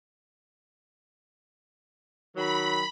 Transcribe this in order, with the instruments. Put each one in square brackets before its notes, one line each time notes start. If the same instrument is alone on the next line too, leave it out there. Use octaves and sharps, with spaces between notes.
[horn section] D#3 F#3 [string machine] B5